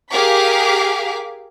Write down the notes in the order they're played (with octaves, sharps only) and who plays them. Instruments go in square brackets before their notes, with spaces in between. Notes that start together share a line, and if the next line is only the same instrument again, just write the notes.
[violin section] G4 G#4 A#4 F5 D6 B6